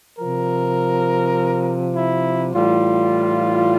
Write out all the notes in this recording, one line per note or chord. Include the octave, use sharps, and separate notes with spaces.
C3 F3 A#4
E4
A2 E3 G3 F4